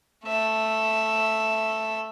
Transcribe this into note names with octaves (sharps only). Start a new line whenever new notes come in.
A3 E5